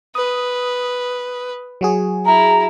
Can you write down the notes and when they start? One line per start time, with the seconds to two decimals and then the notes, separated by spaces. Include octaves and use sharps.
0.15 B4 D#6
1.81 F#3 F#4 G#4
2.25 E4 A#5